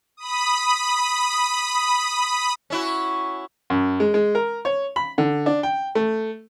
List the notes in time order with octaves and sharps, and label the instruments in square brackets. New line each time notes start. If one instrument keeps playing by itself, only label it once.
[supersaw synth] B5 D#6
[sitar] C#4 E4 F#4
[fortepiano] F#2
G#3
G#3
A#4
C#5
B5
D3
D4
G5
A3